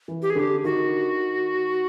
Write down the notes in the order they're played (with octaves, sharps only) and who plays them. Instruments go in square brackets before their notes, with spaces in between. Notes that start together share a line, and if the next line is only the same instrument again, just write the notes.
[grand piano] E3
[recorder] G4
G#4
[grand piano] D3 [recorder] G4
[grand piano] D#3 [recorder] F#4